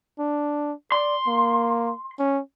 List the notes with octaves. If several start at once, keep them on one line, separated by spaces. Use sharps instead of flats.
D4
D5 C6
A#3
C#4